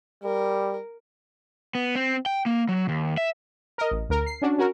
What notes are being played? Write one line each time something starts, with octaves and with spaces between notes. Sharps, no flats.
G3 A#4
B3
C4
G5
A#3
F#3
D#2
E5
A#4 D#5
A1
D2 A#4
C7
C#4 D4 F#4
C#4 F#4 A#4